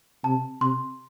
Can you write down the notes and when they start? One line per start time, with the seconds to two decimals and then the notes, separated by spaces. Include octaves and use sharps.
0.24 C3 A5
0.61 C3 C6